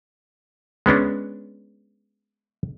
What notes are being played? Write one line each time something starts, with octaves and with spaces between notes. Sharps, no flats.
G#3 B3 C#4 D4